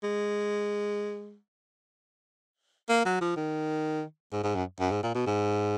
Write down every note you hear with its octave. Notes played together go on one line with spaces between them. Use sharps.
G#3
A#3
F#3
F3
D#3
G#2
G#2
F#2
F#2
G#2
A#2
B2
G#2